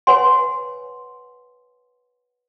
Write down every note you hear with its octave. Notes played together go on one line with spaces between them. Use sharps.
B4 C#5 F#5 G#5 C6